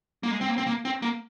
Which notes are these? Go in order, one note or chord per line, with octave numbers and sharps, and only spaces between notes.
A#3
G#3
C4
A#3
C4
A#3
C4
A#3